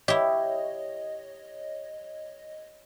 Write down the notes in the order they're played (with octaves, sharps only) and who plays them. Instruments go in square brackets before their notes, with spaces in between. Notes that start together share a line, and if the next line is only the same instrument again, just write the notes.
[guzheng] E4 G4 [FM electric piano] C#5 D#5